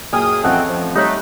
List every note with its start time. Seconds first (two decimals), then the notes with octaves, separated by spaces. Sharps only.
0.13 F#2 A#2 G#4 G5 G#5 D#6 F6
0.43 A1 F2 F3 A3 C4 D#5 F#5
0.69 F3
0.95 G3 A3 D#4 C#5 F#6